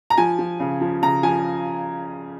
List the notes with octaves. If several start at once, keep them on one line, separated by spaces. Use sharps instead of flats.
A#5
F3 G#5
F3
C#3
F3
C#3 A#5
F3 G#5